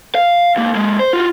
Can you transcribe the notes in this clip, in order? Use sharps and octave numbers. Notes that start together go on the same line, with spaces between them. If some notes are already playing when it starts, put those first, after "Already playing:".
F5
C#2 A#3
G#3 A#3
C5
F4 F#4